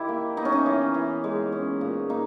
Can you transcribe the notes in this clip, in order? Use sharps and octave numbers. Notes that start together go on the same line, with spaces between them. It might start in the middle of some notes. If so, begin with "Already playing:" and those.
Already playing: D#3 E4 G4
A#3
B3 D#4
C#4
D#4
E3
E3
G#3
C#4
A#2
A#3 D#4